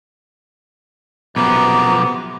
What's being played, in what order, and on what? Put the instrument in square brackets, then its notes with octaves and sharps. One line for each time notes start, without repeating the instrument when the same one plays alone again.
[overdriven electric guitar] B1 F3 [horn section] F#2 C3 B3 [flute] A#5 [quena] D6